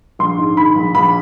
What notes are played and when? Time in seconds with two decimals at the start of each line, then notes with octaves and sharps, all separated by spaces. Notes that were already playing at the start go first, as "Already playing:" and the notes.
0.19 A#1 C6
0.38 G#2
0.57 D#3 B5
0.75 A#1
0.95 A#1 B5